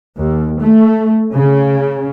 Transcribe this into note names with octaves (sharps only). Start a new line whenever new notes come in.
D#2
A3
C#3